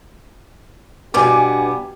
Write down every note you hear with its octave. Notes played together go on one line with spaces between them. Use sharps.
G2 B2 B3 G4 G#5 D6